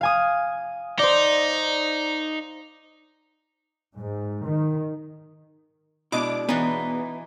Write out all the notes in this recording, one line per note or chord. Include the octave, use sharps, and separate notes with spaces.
F5 G#5 D#6
D#4 C5 D5
G#2
D#3
B2 G#3 D4 E4 D#5 D6
E3 B3 D#4 B4 C#5 G#5